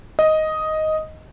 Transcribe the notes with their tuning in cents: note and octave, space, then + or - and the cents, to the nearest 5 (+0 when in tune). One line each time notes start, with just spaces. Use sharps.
D#5 +5